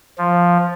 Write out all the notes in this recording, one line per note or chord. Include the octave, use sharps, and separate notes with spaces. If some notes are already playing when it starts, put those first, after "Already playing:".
F3